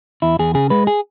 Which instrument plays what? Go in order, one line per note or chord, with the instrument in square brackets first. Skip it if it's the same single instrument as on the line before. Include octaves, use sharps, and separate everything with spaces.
[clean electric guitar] E2 E4
E2 G#4
C#3 G#4
G#3 B4
G#4